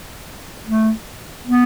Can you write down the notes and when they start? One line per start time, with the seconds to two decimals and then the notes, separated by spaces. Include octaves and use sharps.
0.66 A3
1.47 B3